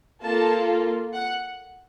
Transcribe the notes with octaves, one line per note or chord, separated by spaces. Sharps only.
A#3 F4 A4 A5
F#5